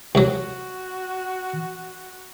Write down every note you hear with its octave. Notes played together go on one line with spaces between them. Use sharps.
C2 F#3 F#4